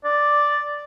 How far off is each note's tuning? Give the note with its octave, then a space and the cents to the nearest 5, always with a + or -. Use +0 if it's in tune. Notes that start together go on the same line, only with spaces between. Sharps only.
D5 +0